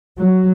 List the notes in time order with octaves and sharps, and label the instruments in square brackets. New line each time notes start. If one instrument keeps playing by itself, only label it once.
[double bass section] F#3